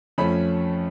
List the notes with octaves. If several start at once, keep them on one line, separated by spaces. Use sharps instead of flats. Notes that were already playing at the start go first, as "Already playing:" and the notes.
F2 F3 A3 C#4 B5